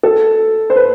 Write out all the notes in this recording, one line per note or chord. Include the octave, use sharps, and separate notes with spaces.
A4
C5
B4